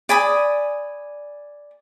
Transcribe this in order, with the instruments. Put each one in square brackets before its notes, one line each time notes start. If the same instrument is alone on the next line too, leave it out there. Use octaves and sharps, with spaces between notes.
[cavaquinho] D5 G#5 B5 D#6